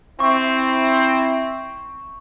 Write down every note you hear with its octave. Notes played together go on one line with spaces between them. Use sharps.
C4 E4 C#6